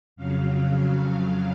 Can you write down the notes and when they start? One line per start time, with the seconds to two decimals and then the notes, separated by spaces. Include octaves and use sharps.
0.16 F2 C#3 F#3 F5